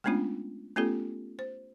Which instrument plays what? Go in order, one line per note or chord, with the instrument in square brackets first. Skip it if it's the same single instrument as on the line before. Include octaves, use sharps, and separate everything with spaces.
[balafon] G#3 A3 B3 C#4 D4 F4
A3 B3 C#4 F4 G4 A4
C5